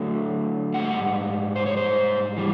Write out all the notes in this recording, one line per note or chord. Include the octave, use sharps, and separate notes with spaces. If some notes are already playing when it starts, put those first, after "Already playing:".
Already playing: D3 F#3 A3
G#2 D#3 G3 F#5
C5
C#5
C5
E3 G3